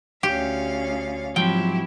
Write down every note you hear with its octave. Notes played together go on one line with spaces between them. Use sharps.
D2 C#4 G4 F5
G#2 F3 F#3 C4 E4 G4 G5